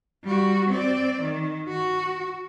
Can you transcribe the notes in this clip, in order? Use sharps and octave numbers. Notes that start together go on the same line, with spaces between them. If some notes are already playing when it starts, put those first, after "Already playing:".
G3 F#4
C4 D5
D#3
F#4